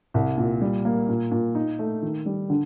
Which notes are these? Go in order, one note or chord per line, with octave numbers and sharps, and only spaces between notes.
C2
A#2
G3
A#3
A#2
A#2
D#4
A3
D#3
G3
D3